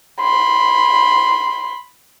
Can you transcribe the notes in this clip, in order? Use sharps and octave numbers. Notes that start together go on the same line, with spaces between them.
B5 C6